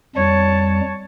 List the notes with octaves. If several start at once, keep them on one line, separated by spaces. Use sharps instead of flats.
F2 G3 C#5 A5